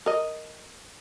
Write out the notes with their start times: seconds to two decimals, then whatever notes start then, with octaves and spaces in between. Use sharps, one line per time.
0.06 A#4 D#5